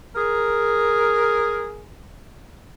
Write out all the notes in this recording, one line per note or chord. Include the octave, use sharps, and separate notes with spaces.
G#4 A#4